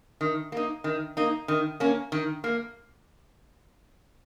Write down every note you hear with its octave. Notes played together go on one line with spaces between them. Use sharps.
D#3
A#3 D#4
D#3
A#3 D#4
D#3
A#3 C#4
D#3
A#3